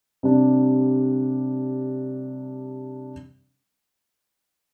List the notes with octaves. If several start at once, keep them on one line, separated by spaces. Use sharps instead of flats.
C3 G3 D4